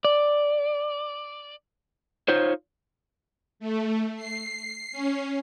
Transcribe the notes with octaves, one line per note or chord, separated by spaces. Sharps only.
D5
D#4 F4 C5 C#5
A3
C7
C#4